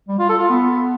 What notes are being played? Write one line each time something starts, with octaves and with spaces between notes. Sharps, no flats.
G3
F4
A4
F4
B3